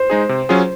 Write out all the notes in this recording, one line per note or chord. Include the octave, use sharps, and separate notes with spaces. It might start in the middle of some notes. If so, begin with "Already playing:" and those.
Already playing: C5
G#3 D#4 G#4
C3
F#3 C#4 F4 G#4